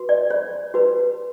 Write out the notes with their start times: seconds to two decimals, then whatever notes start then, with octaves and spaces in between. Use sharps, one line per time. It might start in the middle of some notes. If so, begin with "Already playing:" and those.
Already playing: F#4 B4
0.09 D5
0.30 C#5
0.74 F#4 B4